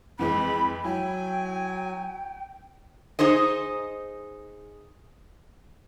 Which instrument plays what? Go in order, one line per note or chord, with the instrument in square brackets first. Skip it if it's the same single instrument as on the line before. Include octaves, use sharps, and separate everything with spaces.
[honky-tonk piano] F2 E3 G#3 [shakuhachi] B5
[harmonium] F#3 G#5 [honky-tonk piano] E4 [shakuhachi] G5
[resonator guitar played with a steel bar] D#4 G#4 C5 D#5